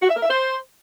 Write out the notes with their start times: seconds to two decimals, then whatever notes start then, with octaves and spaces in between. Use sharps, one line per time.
0.01 F#4
0.09 E5
0.16 A#4
0.23 E5
0.30 C5